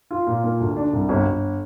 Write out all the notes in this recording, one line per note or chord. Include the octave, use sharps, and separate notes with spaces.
F4
A#2
A#3
D2
D4
C2
G1
G1